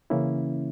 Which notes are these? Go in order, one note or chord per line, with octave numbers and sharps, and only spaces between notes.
C#3 E3 A#3 C#4 E4